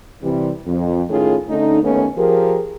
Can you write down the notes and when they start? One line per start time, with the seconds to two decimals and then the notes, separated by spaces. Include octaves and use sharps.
0.22 C3 E3 G3
0.66 F2
1.10 A2 D#3 A3 C#4 F4 G#4
1.49 D3 A3 C#4 D#4
1.83 D#2 A3 B3 C#4
2.18 F3 G4 G#4 A#4